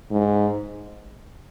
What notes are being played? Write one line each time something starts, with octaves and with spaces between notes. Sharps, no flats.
G#2